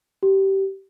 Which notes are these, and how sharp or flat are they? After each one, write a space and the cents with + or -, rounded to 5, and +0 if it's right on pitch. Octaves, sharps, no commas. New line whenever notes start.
G4 -20